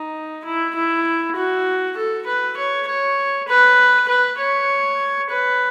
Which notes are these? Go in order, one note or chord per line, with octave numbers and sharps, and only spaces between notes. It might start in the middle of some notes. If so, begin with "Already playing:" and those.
Already playing: D#4
E4
E4
F#4
A4
B4
C#5
C#5
B4
B4
C#5
B4